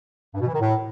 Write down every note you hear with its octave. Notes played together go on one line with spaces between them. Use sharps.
G2
B2
E3
D#3
A2